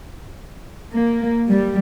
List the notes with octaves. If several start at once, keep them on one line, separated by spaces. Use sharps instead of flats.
A#3
G3